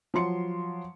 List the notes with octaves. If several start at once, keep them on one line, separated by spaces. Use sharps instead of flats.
F3 F#3 C6 C#7